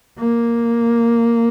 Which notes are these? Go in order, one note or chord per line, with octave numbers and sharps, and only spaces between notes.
A#3